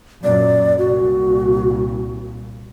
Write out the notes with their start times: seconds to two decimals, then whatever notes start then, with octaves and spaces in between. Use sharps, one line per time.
0.24 F#2 A#2 D5
0.78 C2 A#2 F#4